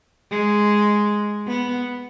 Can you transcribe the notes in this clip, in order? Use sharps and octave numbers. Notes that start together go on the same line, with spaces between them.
G#3
B3